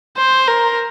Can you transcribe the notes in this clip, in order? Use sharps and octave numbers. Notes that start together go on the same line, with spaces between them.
C5
A#4